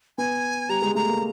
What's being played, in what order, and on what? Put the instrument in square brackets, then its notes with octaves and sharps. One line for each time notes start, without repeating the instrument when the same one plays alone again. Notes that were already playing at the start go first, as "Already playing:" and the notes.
[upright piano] B3 [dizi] G#5
[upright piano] G3 [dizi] A#5
[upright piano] G#3
[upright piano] A3 [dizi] A#5
[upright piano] A#3